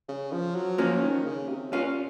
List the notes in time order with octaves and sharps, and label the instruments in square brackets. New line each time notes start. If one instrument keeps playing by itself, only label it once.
[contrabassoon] C#3
F3
F#3
[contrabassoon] F3 [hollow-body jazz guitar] A#3 C#4
[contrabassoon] D#3
C#3
C3
[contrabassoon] A#2 [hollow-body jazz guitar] C#4 F4